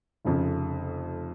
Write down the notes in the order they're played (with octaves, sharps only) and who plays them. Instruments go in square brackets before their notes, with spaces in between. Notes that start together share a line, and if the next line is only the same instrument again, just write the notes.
[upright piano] F1 F2 C#3